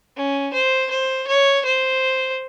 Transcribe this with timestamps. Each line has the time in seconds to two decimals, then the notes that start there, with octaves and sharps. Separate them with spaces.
0.16 C#4
0.53 C5
0.91 C5
1.27 C#5
1.65 C5